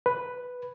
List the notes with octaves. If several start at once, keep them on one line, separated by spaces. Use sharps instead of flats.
B4